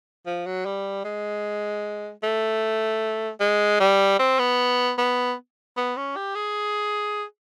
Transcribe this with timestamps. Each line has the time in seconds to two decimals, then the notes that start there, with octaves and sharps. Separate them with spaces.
0.26 F3
0.46 F#3
0.65 G3
1.05 G#3
2.23 A3
3.40 G#3
3.80 G3
4.19 C4
4.39 B3
4.98 B3
5.77 B3
5.97 C#4
6.16 G4
6.35 G#4